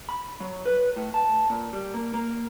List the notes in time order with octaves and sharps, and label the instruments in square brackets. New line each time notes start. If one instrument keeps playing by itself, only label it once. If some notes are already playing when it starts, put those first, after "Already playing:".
[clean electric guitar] B5
F#3
B4
A2
A5
A#2
G3
A#3
A#3